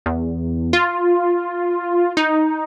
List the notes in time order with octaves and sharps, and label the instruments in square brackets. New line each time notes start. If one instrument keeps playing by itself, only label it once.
[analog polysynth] E2
F4
D#4